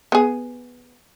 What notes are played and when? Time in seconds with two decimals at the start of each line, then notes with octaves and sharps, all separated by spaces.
0.12 B3 G#4